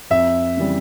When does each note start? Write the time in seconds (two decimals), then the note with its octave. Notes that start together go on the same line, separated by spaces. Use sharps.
0.10 F2 E5
0.57 C#3 E3 G3